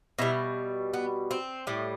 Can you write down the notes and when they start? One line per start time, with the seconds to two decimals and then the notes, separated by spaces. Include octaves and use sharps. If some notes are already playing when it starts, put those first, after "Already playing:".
0.19 B2 G3 E4
0.93 B3
1.31 C4
1.67 A2 G3